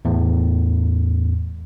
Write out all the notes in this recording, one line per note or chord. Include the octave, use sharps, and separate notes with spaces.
E2 A2